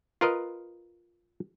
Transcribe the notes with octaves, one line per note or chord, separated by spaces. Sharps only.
F4 A#4 B4 D#5